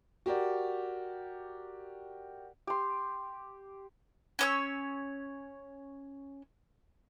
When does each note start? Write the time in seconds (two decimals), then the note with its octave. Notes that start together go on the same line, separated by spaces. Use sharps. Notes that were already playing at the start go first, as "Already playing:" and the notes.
0.26 F#4 G4 A#4 D5
2.67 G4 C6
4.39 C#4 C#5 E6